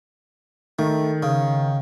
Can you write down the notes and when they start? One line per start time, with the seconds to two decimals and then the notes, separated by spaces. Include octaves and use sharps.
0.79 D#3 A3
1.23 C#3